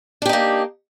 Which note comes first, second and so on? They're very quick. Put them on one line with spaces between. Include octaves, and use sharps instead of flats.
D4 G4 D#4 A#3